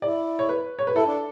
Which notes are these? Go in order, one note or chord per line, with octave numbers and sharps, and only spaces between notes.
E4 D5
C#5
B4
C#5
B4
E4 A4
D4